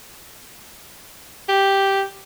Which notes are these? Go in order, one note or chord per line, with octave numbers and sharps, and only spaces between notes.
G4